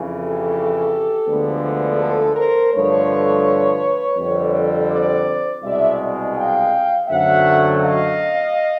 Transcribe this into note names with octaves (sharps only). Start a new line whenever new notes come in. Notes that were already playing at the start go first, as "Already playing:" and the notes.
Already playing: F2 C#3 E3
G4 A4
D2 D3 F3 G#3 B3
A4 B4
A#4 C5
G2 D3 F3 A3 B4 C#5
F2 D3 G3 C4
C5 D5
C2 B2 G#3 D5 E5
F5 G5
F#2 D3 F#3 A3 C4 E5 F#5
D#5 F5